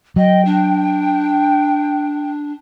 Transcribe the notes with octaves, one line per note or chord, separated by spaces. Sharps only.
F#3 D#5 G5
D4